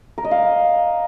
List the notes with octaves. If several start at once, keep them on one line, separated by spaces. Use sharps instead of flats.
A#4
D#5
F5